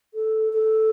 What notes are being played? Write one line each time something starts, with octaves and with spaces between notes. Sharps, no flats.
A4
A4